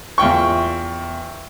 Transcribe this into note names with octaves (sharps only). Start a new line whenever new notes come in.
E2 F4 G5 C#6